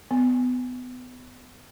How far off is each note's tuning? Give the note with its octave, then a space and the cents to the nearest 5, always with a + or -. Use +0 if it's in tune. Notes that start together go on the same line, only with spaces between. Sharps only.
B3 +25